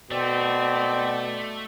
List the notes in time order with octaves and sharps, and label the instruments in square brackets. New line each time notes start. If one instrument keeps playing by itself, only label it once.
[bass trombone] B2 [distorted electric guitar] A3 [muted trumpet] C4 [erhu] D5